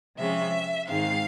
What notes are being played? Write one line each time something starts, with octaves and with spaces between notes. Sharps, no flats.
C3 F3 G#3 C#4 E5
G#2 D#3 G#3 C4 F5